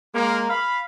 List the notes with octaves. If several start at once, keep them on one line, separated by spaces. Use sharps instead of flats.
G#3 A#3
F5 B5